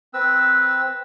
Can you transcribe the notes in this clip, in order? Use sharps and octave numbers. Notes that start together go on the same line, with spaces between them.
C4 B4 E6